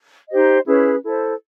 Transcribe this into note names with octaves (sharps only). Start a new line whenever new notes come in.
D#4 G4 C5 D#5
C#4 E4 G#4 B4
E4 A4 C5